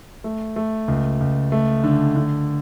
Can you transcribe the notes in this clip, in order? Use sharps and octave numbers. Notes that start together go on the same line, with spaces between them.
A3
A3
C#2
C#2
A3
D3
D3